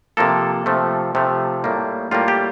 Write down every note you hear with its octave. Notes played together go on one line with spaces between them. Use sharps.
C3 F3 A#3 A4
C3 F3 A3
C3 F3 A3
A2 G3 A#3
A2 G3 A#3 F4
G4